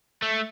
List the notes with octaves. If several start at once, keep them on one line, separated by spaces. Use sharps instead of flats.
A3